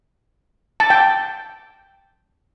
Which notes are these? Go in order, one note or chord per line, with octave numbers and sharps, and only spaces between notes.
A5
G5